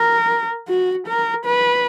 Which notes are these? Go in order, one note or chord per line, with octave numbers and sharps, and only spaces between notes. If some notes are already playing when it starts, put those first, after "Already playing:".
Already playing: A#4
F#4
A#4
B4